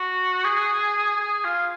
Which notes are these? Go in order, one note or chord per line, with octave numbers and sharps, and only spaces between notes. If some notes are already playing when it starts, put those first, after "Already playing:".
Already playing: F#4
G#4
G#4
F4